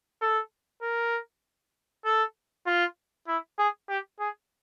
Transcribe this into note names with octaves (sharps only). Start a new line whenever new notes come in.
A4
A#4
A4
F4
E4
G#4
G4
G#4